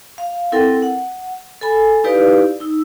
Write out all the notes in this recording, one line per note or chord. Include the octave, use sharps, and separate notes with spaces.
F5
C4 E4 A4 A#4 F#5 G5
F#5
A4 G#5 B5
D#4 E4 G4 B4 D5 F5
D#4 E6